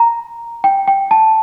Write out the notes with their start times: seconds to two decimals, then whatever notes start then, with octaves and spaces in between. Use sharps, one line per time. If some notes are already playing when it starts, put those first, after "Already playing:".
Already playing: A#5
0.64 G5
0.88 G5
1.11 A5